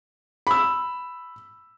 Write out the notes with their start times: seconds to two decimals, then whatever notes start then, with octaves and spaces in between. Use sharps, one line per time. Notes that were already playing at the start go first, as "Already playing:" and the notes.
0.47 B5 E6